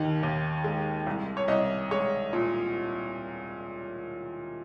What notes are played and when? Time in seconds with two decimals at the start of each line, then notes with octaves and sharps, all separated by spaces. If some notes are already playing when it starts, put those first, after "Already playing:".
Already playing: D#2 D#3
0.23 D#2
0.64 G#3
1.07 C2
1.37 C#5
1.48 C2 D#5
1.91 G#3 C#5
2.33 A#2